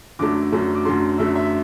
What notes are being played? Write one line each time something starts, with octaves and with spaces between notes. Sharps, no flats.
F#2 D3 F#3 A3 D6
F#2 D3 F#3 A3
D6
F#2 D3 F#3 A3 C6
F#2 D3 F#3 A3 E5
E5